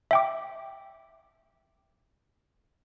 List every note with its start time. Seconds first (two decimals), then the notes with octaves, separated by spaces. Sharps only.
0.11 E5 G5 D6